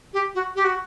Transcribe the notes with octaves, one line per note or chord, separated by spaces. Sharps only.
G4
F#4
G4
F#4